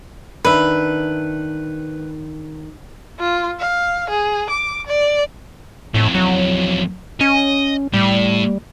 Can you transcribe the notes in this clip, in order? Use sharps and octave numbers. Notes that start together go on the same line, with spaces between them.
D#3 D4 B4 E5
F4
F5
G#4
D6
D5
F2 A2 E3
F#3
C#4 D#5
A2 G3